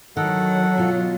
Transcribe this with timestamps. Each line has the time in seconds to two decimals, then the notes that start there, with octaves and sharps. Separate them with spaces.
0.17 D#3 F#3 A4 F#5
0.77 B2 F4